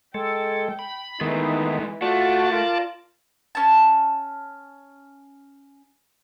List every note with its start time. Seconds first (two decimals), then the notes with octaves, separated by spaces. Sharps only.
0.14 G#3 A4 G5
0.79 B5
1.21 D#3 E3 G#3 A3 B3 D#4
2.02 A3 F4 F#4 D5 A5
2.52 F4 A#4
3.55 C#4 A5